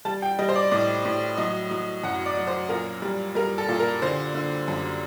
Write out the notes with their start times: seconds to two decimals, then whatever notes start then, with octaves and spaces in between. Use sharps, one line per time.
0.05 G3 A5
0.22 G5
0.39 G3 D#5
0.49 C5
0.55 D5
0.71 A2 D5
1.05 A2
1.37 F#3 D#5
1.71 F#3
2.03 F#2 F#5
2.26 D5
2.37 F#3
2.47 C5
2.69 A#2 A#4
3.02 G3
3.35 G3 A#4
3.58 A4
3.69 A#2
3.80 A#4
4.02 D3 C5
4.35 D3
4.68 F#2